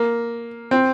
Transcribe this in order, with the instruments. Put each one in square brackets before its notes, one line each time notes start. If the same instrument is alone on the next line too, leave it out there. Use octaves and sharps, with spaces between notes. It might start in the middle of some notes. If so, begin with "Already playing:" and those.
Already playing: [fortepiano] A#3
C4